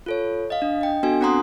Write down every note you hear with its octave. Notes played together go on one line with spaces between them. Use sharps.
F4 A4 C#5
D#5 F5
D4
D#5 G5
B3 D4 F#4 A4 G#5
C4 D4 F#5 A#5 C6 D#6